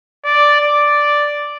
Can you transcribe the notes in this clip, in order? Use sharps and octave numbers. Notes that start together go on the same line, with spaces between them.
D5
D5